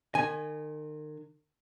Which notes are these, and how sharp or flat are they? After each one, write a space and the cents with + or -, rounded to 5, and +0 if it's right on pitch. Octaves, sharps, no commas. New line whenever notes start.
D#3 -40 G#5 +0